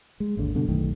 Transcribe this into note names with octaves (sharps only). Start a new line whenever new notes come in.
G#3
G#1 D#2 D3
G2 B2 D3
B1 F#2 D#3 A3